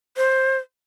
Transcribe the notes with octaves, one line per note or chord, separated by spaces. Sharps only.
C5